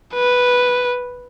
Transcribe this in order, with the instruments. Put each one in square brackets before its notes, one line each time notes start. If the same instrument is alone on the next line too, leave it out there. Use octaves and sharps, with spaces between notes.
[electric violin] B4